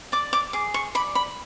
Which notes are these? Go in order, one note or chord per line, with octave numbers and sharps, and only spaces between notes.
D5 D6
D6
G#4 D6
C#6
D5 B5
B5